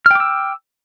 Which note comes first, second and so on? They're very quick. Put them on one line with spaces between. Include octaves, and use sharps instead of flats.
F6 G5 D6 E6